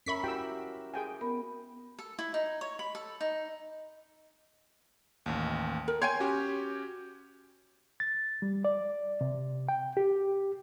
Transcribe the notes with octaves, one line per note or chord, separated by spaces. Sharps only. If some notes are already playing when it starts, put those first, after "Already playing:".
C#4 A#4 E5 B5 C#6 B6
E4 F#4 G4 G5 E6
G#4 G5 G#5
B3 A#4 B5
A4
E4
D#4
C#5
B5
A4
D#4
A1 D#2
A#4
C#5 G5 G#5 C6 G6 G#6
C#4 F#4 G4
A6
G3
D5
C3
G5
G4